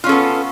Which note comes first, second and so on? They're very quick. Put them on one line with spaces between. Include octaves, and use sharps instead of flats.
F4 C#4 A4 B3